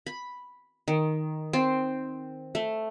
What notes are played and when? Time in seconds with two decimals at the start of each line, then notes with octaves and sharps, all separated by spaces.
0.07 B5
0.88 D#3
1.53 C4
2.55 A3